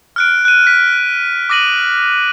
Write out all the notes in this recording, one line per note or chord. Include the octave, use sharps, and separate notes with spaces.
F6 F#6 D7
F#6 D#7
B6
D6 D#6 A#6 D#7 F#7